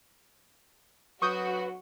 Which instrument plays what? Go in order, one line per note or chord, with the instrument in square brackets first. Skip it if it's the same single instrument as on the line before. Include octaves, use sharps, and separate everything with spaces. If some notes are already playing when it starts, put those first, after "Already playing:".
[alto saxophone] F#3 [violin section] F#4 [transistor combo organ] B4 [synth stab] C#6 D#6 G6